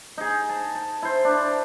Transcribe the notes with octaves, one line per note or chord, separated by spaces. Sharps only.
D#4 G#4
A5
A5
E4 C5
D4